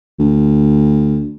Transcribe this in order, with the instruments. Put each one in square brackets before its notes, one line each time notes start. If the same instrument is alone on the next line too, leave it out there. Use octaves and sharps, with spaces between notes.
[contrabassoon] D2